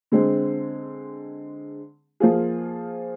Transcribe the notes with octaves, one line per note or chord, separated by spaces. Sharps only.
D3 G#3 C4
F3 A#3 F4 G#4